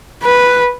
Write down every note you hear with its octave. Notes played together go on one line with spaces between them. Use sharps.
B4